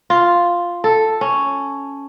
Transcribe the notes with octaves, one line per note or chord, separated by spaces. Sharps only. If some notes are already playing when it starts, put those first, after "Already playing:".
F4
A4
C#4